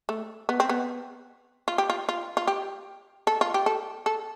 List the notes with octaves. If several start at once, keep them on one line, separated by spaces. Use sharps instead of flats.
A3
B3
C4
B3
F4
G4
F4
F4
F4
G4
A4
F4
G4
A4
A4